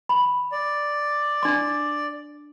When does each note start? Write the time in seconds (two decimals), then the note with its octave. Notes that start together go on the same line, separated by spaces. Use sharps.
0.09 B5
0.52 D5
1.43 D4 C6